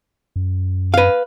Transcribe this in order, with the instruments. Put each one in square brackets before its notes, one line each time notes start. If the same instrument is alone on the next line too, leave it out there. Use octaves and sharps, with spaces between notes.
[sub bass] F#2
[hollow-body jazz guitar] B4 F5